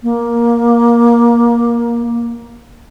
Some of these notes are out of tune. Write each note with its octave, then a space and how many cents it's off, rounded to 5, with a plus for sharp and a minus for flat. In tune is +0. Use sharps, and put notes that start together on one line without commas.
A#3 +15